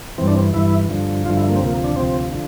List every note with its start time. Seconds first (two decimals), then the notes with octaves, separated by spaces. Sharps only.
0.18 G2 E3 C4
0.27 D4
0.35 C4
0.54 G2 E3 E4
0.89 G2 D3 F3
1.25 G2 D3 F3 F4
1.37 E4
1.49 A#3
1.56 C4
1.61 D2 C3 F3 A#3
1.84 D4
1.96 D2 C3 F3 C4
2.32 D3 F3